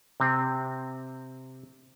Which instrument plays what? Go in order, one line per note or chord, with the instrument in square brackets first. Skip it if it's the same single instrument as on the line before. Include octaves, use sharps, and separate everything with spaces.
[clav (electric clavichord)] C3 C4